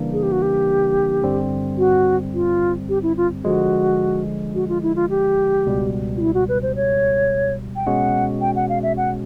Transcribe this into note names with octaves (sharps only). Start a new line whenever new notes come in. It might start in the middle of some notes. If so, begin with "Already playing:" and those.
Already playing: C#3 E3 G3 A#3 D4
G#4
G4
F#4
G4
G2 D3 G3 C4
F#4
F4
G4
E4
F4
D3 F3 G#3 F#4
F#4
F4
E4
F4
G4
C#2 B2 G3
F4
E4
F#4
B4
C5
C#5
G5
B2 G#3 C#4 F#4 F#5
G5
F#5
F5
E5
F#5